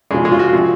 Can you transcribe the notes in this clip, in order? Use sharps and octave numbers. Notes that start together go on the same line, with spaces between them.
C#3 F3 G#3
G#3
F4
F#4
C3 F3